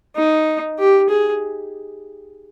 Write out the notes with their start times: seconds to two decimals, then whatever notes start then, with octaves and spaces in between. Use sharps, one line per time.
0.16 D#4
0.79 G4
1.09 G#4